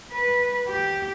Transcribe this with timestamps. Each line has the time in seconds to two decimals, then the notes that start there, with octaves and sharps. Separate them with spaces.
0.12 B4
0.68 G4